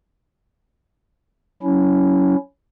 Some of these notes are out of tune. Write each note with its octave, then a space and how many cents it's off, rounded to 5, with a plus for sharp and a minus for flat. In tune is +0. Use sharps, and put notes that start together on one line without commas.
F#3 +0 C#4 +15 E4 -10